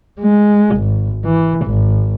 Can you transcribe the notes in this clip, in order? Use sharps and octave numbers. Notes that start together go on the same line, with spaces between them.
G#3
G#1
E3
G#1